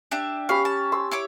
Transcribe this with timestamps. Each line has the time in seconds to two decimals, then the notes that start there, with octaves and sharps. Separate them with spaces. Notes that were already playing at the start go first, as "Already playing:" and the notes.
0.11 D4 G4 E5
0.49 C#4 G4 F5 B5
0.65 A5
0.92 C6 E6
1.11 E4 C#5 D6